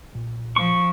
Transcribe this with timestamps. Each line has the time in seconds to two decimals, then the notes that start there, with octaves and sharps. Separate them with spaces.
0.13 B1 A#2
0.56 F3 C#6